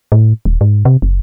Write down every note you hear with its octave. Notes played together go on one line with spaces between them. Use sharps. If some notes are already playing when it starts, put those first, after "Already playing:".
A2
D#1
G#2
C3
F#1